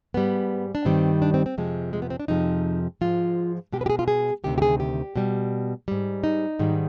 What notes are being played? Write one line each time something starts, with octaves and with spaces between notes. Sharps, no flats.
G#2 G3 B3
D4
G2 D#3 G3 C4
D4
C4
C4
F2 C3 F3 G#3
G#3
B3
C4
D4
F2 C3 F3 G#3 D#4
G#2 F3 G#3 F4
B2 G#3 G4
B4
G4
G#4
F4
G#4
D2 C3 D#3 G4
G4
G#4
G4
B2 G3
G#2 G3
D#4
G#2 D#3 G3